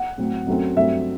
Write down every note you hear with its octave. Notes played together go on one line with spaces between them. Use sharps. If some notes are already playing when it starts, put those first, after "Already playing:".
Already playing: F#5
A2 F#3 C4
F#2 F#3 A3 C4
G2 F#3 A3 C4 E5